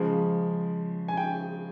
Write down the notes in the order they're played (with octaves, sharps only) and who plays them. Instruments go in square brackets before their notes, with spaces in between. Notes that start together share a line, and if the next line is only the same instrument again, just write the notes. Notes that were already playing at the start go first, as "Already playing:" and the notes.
Already playing: [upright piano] C#3 F3 G#3
G#5
G5